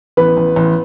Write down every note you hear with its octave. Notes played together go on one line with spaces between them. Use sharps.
A1 B3 B4
A1
A1